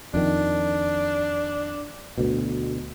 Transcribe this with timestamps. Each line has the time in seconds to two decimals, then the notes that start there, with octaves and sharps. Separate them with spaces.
0.14 F2 D#3 D4
2.18 D2 B2